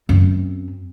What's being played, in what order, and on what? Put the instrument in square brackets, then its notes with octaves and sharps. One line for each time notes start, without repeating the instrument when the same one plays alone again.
[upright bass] F#2 C4